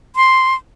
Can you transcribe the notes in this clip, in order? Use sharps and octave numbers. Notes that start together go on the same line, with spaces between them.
C6